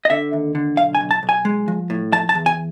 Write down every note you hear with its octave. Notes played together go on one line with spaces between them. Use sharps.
D#5
D3 E5
D#2
D3
B1 F5
G#5
B1
A5
B1
G#5
G#3
F3
A2
F3 A5
A5
E2
G#5